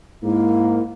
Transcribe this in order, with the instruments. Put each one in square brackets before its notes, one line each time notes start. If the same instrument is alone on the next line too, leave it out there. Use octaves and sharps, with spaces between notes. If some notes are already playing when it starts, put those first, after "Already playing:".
[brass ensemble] G#2 A#3 [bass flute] E4